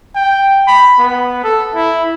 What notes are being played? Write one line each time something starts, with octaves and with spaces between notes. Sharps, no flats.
G5
B5
B3
A4
E4